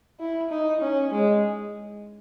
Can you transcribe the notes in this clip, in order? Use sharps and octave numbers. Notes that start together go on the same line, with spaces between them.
E4
D#4
C#4
G#3